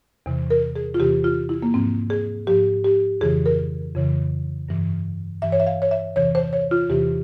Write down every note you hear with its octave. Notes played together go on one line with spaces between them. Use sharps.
E2 C3 E3
A#4
G#4
F4
E2 C3 E3 G4
F4
E4
A#3
G#2 F3 C4
G#4
G#2 F3 G4
G4
F2 C#3 E3 G#4
A#4
F2 C#3 E3
G2 E3
G2 E3 E5
C#5
E5
F5
C#5
E5
E2 C3 E3 C#5
C5
C#5
F4
E2 C3 E3 G4